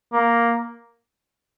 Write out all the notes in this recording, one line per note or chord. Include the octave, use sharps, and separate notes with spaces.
A#3